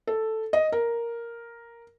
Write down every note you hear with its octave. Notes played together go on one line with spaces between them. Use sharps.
A4
D#5
A#4